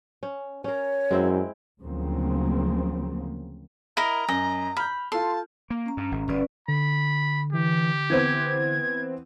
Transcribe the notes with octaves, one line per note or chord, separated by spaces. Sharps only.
C#4
C#4 A#4 C#5
F#2 G#3 C4 E4
D2 C#3 F3 F#3 A#3 C4
E4 A#4 D#5 A#5
F#2 D#5
B5 F6 G6
F4 A4 A5 C6
A#3
C#4 A#5
G2
G#1
G1 C#4 B4 D5
D3 B5
E3 G4
E3 B3 C4 G#6